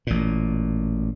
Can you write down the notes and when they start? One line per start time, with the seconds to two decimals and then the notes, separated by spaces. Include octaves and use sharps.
0.07 A1 A#2